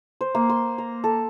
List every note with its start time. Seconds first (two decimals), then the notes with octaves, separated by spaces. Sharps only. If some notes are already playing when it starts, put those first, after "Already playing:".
0.21 C5
0.35 A#3
0.49 C6
0.78 A#5
1.04 A4